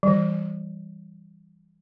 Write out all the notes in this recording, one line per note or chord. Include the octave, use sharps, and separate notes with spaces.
E3 G3